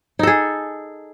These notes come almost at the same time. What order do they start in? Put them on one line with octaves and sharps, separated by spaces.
D#4 A4 G#4